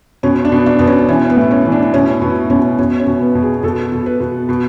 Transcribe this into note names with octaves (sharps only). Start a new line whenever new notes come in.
B2 C#4
D4
B2
D4
B2 B3
C#4
E3 C#4
B3
A2
C#4
E3
D4
B2 C#4
B2 B3
B2 C#4
B2 C#4
C#4
B2
B3
B2
G#4
B2 A4
B2
B4
B2
B2